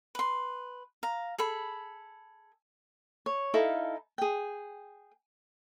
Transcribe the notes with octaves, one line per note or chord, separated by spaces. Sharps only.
B4 C6
F5 A#5
G#4 A4 B5
C#5
D#4 E4 A4 F5
G#4 G5